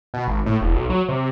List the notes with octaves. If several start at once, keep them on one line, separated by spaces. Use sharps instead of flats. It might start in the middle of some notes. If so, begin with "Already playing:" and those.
B2
G#1
A2
E1
B1
F#3
C3